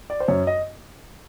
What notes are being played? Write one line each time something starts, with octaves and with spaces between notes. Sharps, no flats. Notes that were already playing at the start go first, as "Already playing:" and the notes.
D5
C5
F#2 C#5
D#5